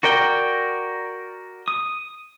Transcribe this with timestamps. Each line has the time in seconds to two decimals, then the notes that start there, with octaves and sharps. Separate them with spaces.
0.03 F#4 A#4 D5 G5
1.68 D#6